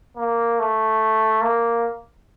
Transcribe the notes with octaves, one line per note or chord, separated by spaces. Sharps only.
A#3
A3
A#3